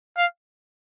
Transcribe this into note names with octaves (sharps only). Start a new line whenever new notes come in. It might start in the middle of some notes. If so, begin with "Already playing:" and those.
F5